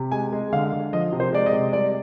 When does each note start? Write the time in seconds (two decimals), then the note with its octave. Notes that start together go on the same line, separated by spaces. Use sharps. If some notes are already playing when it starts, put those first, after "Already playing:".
Already playing: C3
0.12 G#3 G#5
0.32 G#3
0.52 D3 F5
0.73 D3
0.93 F3 D#5
1.12 C3
1.20 C5
1.33 G#3 D5
1.46 D#5
1.53 C3
1.73 G3 D5